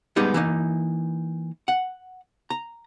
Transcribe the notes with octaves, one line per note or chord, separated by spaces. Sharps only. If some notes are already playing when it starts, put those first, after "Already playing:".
G3 G#3 B3 D#4 G4
E3 A#3 D#4
F#5
A#5